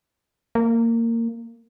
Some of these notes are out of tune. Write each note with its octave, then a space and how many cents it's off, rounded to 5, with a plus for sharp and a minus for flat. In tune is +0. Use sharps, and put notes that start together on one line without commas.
A#3 -20